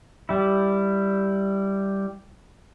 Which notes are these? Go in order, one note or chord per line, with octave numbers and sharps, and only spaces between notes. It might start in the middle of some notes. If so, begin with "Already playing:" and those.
G3 E4